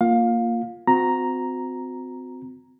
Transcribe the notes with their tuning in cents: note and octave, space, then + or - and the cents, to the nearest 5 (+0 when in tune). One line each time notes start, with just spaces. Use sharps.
A#3 -10 F4 +0 F5 +20
C4 -30 F#4 -35 A#5 +0